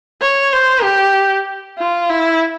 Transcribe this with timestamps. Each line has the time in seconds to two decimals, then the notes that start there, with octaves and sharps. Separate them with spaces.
0.21 C#5
0.53 C5
0.84 G4
1.78 F4
2.10 E4